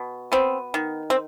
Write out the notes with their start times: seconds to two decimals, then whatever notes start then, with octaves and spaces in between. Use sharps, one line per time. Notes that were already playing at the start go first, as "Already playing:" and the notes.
Already playing: B2
0.32 B3 C4
0.74 D#3
1.10 C4